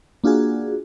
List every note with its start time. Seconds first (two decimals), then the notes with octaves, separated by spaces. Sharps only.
0.24 A#3 D4 F4 F#4 G#4